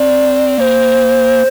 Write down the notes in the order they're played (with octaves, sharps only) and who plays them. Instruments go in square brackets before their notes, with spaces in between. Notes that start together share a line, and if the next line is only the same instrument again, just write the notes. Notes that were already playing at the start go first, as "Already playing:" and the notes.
Already playing: [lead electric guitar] C4 [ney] D5
[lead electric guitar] A#3 [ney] C5 D5